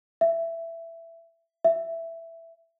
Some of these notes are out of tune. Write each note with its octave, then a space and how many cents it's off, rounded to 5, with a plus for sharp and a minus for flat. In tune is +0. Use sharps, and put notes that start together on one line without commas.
E5 +10
E5 +5